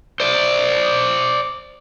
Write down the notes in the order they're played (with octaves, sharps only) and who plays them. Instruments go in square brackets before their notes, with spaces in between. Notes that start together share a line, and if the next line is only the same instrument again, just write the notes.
[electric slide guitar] C5 D5